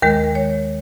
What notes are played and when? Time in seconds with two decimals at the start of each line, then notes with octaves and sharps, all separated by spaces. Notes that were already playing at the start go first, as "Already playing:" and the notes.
0.02 D#2 D#3 G#3 A#4
0.35 C#5